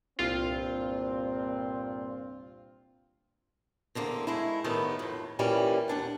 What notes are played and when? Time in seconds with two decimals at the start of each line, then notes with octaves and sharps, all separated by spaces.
0.19 C2 G2 A#2 C4 F4
3.95 E2 D3 A#3 C4
4.27 G#3 A3 E4
4.64 A2 D#3 G3 A3 B3
4.99 F2 A2
5.39 A#2 E3 G3 C#4
5.88 D#2 D4 F#5